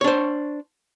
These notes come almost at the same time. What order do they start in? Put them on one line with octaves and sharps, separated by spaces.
C#5 D4 C5